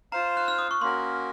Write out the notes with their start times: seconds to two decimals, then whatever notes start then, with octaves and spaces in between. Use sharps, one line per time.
0.12 F4 C5 F5 A#5
0.37 F#6
0.48 F6
0.58 D#6
0.71 C#6
0.81 A#3 C#4 F#4 A#4 C6